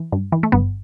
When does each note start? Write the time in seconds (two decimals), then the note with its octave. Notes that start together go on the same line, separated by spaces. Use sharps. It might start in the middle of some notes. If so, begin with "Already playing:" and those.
Already playing: E3
0.12 G2
0.32 E3
0.43 A3
0.52 G1 B3